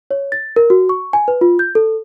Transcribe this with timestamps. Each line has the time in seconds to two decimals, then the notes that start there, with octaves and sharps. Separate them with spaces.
0.11 C#5
0.32 A6
0.56 A#4
0.70 F#4
0.89 C#6
1.13 G#5
1.28 B4
1.41 F4
1.59 G6
1.75 A4